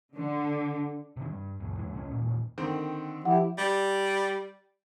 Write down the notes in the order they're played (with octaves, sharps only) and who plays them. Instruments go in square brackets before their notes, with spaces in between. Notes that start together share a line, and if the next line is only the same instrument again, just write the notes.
[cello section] D3
[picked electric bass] C3 D#3
G2
C#2 F#2
E2 G#2 E3
C2 G#3 C#4
E1 A#2
[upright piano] D3 D#3 C4
[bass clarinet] F3 [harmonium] E4 G4 [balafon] F#5
[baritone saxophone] G3